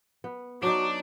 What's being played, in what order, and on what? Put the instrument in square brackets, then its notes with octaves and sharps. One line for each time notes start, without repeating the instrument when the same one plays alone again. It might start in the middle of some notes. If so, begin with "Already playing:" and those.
[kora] B3
[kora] F#3 D#4 [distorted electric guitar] D4 [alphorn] F#4 [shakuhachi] D6